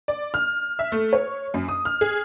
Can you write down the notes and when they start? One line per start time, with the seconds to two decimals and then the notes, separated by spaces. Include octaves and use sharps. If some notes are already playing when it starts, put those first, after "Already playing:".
0.08 D5
0.34 F6
0.79 E5
0.92 A3
1.13 C#5
1.54 F#2
1.68 D#6
1.85 F6
2.01 G#4